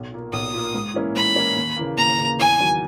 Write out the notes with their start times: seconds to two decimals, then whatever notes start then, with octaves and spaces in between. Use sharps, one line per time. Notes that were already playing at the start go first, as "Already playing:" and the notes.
Already playing: B1
0.12 A#2 A#3
0.33 B1 D#6
0.53 A#2 A#3
0.74 G#2
0.94 E3 A#3 C#4 E4
1.15 G#2 B5
1.35 E3 A#3 C#4 E4
1.56 D#2
1.76 C#3 E3 A#3
1.97 D#2 A#5
2.18 C#3 E3 A#3
2.39 E2 G#5
2.59 D#3 F#3 A#3